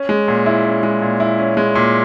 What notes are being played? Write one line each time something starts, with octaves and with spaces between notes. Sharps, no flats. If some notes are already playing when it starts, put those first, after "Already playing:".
Already playing: C#4
G#3
A#2
E4
C#4
G#3
A#2
E4
C#4
G#3
A#2